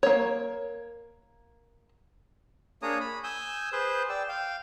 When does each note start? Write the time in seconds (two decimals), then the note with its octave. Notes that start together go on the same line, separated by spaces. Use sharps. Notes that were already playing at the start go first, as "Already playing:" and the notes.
0.03 A#3 C#5
2.83 A#3 D4 G#4 C#5 A#5 D#6
3.00 B5
3.24 G#5 D#6 E6 G6
3.73 G#4 B4 C5 G6
4.09 D5 G5 E6
4.29 F5 G5